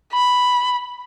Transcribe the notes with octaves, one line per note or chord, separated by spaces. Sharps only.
B5